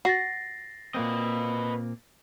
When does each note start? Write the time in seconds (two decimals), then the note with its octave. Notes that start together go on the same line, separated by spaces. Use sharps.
0.05 F#4 A6 A#6 C7
0.94 A#2 A#3 C4 B4 D#5